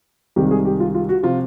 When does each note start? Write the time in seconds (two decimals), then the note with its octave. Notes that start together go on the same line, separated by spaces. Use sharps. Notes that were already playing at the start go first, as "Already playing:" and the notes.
0.36 C2 C3 D#3 G#3 G4
0.51 G#4
0.65 G4
0.80 F4
0.94 F4
1.09 F#4
1.23 C3 F3 F4